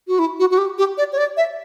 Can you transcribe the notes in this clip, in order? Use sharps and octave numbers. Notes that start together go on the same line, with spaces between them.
F#4
E4
F#4
F#4
G4
G4
D5
C#5
D5
E5